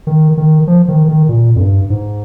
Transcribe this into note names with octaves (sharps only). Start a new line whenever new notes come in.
D#3
D#3
F3
D#3
D#3
A#2
F2
G2
G#2